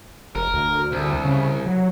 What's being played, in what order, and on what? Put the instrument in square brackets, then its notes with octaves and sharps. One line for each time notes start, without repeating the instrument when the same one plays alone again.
[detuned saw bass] F1 [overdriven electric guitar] A#4
[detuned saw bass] D2
[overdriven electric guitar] C2
[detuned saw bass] C#3
F#3